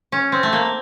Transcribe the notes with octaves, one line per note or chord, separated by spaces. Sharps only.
C#4
C4
A3
A#3